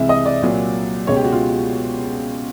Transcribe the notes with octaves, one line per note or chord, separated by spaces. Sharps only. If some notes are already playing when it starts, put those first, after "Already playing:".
Already playing: C2 C3 E3 G#3 E5
D#5
D5
C2 A#2 F#3
C#2 B2 G#3 C#5
G4
F#4
F4